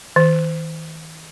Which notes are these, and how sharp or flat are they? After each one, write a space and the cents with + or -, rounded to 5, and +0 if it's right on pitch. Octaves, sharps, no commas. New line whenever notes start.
D#3 +45